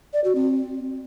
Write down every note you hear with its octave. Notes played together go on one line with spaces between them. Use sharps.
D5
F#4
C4